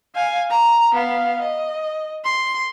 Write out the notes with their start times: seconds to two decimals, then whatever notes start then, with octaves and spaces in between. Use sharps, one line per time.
0.15 F5 G#5
0.51 A#5
0.93 B3 F5
1.42 D#5
2.25 C6